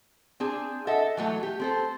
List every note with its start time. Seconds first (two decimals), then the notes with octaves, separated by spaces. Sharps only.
0.40 C4 D4 G#4
0.87 A4 D#5 E5 F#5
1.17 E3 F#3 A3
1.43 G4
1.60 C4 A4 C5